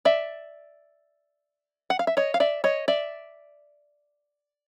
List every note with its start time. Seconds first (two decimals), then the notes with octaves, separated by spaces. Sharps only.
0.05 D5 E5
1.90 F#5
1.99 F5
2.07 E5
2.17 C#5 D#5
2.34 F5
2.40 D5 E5
2.64 C#5 D#5
2.88 D5 E5